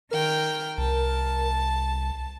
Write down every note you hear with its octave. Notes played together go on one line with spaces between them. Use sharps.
D#3 A#4 G5 F6
C2 A5